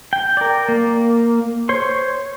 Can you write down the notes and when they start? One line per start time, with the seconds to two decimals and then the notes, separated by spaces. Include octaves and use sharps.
0.13 G5
0.37 A#4 D5
0.68 A#3
1.69 C5 C#5 C6